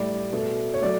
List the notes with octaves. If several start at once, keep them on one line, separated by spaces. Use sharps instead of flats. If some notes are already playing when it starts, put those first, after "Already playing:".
Already playing: A2 G3 D5
B2 A3
C#5
F#3 A3 D5